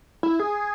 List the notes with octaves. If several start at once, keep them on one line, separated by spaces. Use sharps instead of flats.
E4
G#4